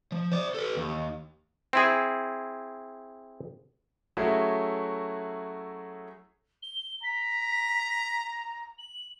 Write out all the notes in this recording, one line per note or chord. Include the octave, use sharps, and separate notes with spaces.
F3
C5 D5
A4 B4
D#2
C4 E4 G#4
F#3 A3 C#4 E4 F#4 G#4
G7
A#5 B6
F#7